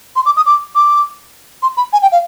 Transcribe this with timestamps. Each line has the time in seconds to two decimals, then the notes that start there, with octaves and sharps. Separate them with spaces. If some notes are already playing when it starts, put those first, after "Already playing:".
0.16 C6
0.26 D6
0.37 D#6
0.46 D6
0.75 D6
1.63 C6
1.77 B5
1.93 G#5
2.02 G5
2.12 F5